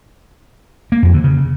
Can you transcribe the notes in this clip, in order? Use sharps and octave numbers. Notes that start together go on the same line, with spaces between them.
A#3
F2
D3
C#3